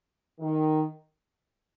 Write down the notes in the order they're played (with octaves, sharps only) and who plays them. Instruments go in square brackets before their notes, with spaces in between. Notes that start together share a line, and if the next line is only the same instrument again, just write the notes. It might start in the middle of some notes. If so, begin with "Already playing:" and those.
[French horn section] D#3